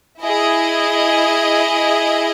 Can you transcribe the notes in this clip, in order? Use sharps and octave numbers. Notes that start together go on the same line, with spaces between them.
E4 G#4 D#5